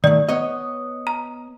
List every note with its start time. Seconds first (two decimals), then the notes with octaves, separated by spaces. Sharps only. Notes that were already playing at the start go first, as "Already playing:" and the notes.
0.04 D#3 A3 D5
0.29 B3 C#5 D#5
1.07 A#5